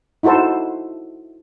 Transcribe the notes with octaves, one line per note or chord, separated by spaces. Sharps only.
D#4 E4 F#4 A4 C5